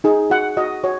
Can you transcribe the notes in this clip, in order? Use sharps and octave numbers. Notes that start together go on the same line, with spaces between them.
D#4 G#4
F#4 F#5
F#4 D#5
F#4 C#5